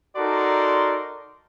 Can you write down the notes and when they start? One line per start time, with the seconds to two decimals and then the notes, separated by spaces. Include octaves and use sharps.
0.16 D#4 F#4 A4 A#4 D5 C6